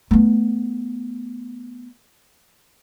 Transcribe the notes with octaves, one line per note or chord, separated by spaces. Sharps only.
A3 B3